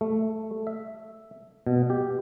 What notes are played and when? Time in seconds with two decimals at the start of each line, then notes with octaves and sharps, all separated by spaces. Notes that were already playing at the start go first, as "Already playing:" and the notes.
0.01 A3
0.67 E5
1.67 B2
1.90 G4